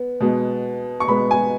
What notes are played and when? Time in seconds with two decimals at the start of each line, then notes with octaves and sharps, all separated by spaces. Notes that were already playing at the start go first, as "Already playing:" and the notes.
Already playing: B3
0.20 B2 G#3 B3
1.00 C#6
1.08 B2 G#3 B3 B5
1.31 G#5